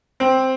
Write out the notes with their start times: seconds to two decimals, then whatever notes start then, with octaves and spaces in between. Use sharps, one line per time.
0.20 C4